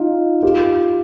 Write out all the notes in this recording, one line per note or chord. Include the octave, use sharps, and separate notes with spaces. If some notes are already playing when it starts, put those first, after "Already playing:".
Already playing: D#4 F4
F4 G4